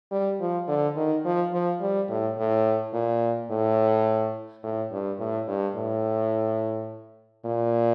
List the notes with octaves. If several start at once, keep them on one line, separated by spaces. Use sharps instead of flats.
G3
F3
D3
D#3
F3
F3
G3
A2
A2
A#2
A2
A2
G2
A2
G2
A2
A#2